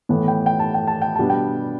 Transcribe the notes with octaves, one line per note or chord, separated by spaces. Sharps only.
A2 E3 B3
G5
G5
A5
G5
A5
G5
B2 G3 B3 D4 A5
G5